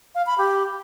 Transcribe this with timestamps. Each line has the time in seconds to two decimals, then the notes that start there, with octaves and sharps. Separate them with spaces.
0.15 F5
0.26 B5
0.38 G4